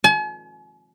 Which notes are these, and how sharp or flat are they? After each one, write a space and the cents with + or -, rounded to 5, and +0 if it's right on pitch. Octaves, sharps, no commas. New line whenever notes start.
G#5 +45